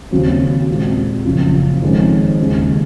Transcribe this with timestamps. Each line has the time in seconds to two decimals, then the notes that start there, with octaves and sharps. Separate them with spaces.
0.11 D#2 C#3 F#3 C4
0.68 A#2 G#3 C4
1.26 F#1 F2 C#3 F3
1.82 F2 D#3 G#3 C#4
2.39 D#2 C#3 G#3